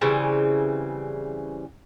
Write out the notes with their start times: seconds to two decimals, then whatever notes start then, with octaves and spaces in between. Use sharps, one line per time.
0.01 C#3 E3 G3 C4